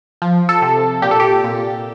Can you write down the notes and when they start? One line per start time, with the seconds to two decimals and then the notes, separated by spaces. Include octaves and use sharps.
0.22 F3
0.49 A4
0.62 C3
1.02 A#2 G4
1.11 A4
1.20 G4
1.44 A#2